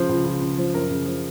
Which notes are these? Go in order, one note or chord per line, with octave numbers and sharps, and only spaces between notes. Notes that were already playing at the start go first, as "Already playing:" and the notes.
Already playing: C#3 F3 C5
C#2
C#2
C#3
F3
F#2 A#4
C#3
F3